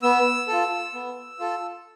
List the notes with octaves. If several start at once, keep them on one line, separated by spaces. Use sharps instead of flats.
B3 E6
F4 A4
B3
F4 A4